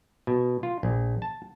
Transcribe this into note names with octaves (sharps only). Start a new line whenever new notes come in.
B2
F4
A#1
A5